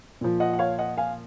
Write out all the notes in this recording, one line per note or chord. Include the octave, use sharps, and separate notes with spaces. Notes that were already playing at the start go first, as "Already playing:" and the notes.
A#2 F3
D#5 F#5
F#5
C#5 F5
D#5 F#5
F5 G#5